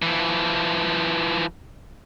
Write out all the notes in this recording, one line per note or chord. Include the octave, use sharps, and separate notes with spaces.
E3 F3